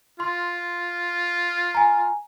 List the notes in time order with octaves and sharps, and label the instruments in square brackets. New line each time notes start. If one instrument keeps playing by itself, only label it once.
[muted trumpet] F4 [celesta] C6
[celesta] G#5 A#5